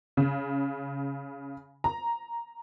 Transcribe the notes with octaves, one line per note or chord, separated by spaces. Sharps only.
C#3
A#5